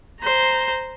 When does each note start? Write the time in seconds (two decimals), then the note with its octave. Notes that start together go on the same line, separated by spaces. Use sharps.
0.21 C5 A#5